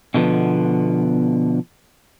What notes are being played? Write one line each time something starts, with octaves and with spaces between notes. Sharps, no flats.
B2 D3 F3 B3